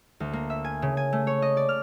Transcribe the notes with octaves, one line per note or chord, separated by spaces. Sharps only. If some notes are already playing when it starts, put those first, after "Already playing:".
D2
A#3
E5
G#5
C#3
G#5
A3
C#5
D#5
D5
F6